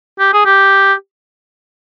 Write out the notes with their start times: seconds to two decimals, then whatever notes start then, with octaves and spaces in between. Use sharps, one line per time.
0.19 G4
0.33 G#4
0.45 G4